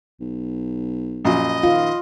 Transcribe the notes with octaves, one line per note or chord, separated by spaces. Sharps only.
B1
A#1 F#2 D#5
D#3 F4